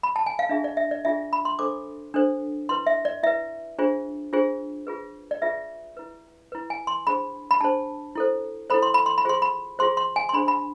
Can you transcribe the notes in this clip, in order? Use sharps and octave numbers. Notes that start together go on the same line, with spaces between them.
B5
A5
G#5
F5
D4 F4 G#4 E5
D5
E5
D5
D4 F4 G#4 E5
B5
C6
D4 A4 C5 D6
D4 A4 C5
E4 B4 C6
E5
D5
E4 B4 E5
D4 F4 G#4 C5
D4 F4 G#4 C5
F4 G#4 B4
D5
F4 G#4 B4 E5
E4 B4
E4 B4
G#5
C6
D4 G#4 C5 B5
B5
D4 G#4 C5 A5
E4 A4 C5
E4 A4 C5 B5
C6
B5
C6
B5
F4 G#4 C5 C6
B5
F4 G#4 C5 C6
C6
G#5
C6
D4 G#4 C5 B5
B5